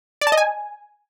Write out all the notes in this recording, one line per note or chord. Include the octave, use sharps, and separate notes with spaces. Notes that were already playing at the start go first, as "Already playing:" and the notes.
D5
A5
D#5
G#5